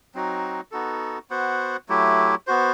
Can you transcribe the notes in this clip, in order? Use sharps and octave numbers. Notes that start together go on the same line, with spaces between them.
F#3 C4 D#4 F#4
B3 D#4 F#4 A4
B3 F#4 C5 F#5
F#3 A3 E4 G4
B3 F#4 C5